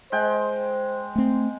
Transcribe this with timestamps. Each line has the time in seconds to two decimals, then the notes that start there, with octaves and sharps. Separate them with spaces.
0.12 G#3 C5 G5
1.16 A3 C4